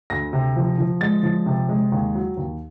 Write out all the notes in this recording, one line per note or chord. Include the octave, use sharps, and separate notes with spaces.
D2 A#6
C3
F3
F3
G#3 A6
F3
C3
G#3
D#2
F#3
D#2